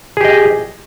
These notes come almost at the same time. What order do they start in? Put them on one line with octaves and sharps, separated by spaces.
G#4 G4 D#5